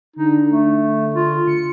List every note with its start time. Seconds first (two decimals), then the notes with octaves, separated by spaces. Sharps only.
0.16 D3 D#4
0.49 A3
1.14 F4
1.47 C#7